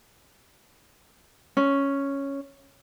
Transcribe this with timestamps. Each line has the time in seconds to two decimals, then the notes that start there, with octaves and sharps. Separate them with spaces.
1.57 C#4